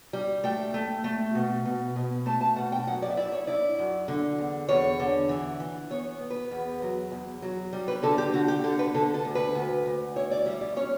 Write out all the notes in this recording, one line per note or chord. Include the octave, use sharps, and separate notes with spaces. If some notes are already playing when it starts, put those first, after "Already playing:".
G3
A3 G5
A3
A3
B2
B2
B2
A3 A5
A5
B2 F#5
G5
F#2 F#5
D5
E5
E4 D5
C#5
E4 D5
F#2
D3
E2
E2 C#5
D3
E3
E3
B3 C#5
B3
B4
E2
F#3
E2
F#3
G3
B4
D3 A4
G4
D3 F#4
G4
D3 A4
B4
D3 A4
A4
D2
B4
D2
D2
E4 C#5
D5
G3 E5
D5
C#4 C#5